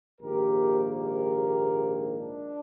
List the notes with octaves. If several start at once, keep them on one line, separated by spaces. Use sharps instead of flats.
A#1 G#2 D#3 A#3 G4 A#4
G4 A#4
D4